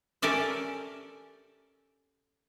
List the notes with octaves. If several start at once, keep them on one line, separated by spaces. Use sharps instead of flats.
C#4 G4 A4 A#4 D5 E5